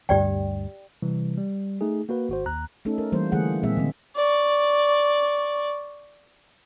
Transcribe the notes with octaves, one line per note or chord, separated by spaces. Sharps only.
D2 G2 G4 D5 G5
C3 E3 G3
G3
A3 D#4 G#4
A#3 F#4 B4
G#1 F#4 C5
D#2 A#5 F#6
A3 C#4 D#4 A4
A#4
E3 G3 A#3 C5
D3 E3 A3 A#3 G#4 F#5
A#2 G#3 A#3 C4 G#4 E5
D3 D#3 C4
D5 C#6